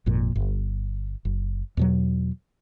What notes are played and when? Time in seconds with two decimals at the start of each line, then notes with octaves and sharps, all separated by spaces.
0.06 G#1 F2 A#2
0.36 G1
1.25 F#1
1.77 E2 B2 F#3